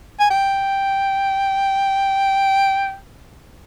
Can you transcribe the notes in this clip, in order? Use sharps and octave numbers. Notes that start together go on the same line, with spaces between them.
G#5
G5